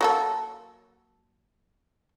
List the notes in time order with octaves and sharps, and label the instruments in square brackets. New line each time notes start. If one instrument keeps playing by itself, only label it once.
[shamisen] F#3 A#3 A4